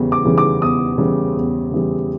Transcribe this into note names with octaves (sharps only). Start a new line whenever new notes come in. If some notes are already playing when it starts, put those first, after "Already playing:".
Already playing: E2 C#3 E3 G3
D6
C#3 E3 G3
D6
E2 D#6
C#3 E3 G3
E2
C#3 E3 G3